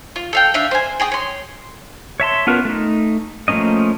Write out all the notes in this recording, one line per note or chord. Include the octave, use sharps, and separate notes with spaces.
F4
A4 F5 G5
D4 E5 F5
C5 G#5
G#4 G5 D#6
C#5 C6
C#5 E5 A5 C6
B3 C#4 F4 A#4 B4
A3 D#4
F3 A3 A#3 C#4 D#5